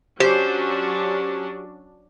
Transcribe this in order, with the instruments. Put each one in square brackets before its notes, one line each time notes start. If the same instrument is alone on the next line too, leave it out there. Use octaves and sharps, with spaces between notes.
[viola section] F#3 C#4 D4 [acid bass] G4 [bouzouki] C5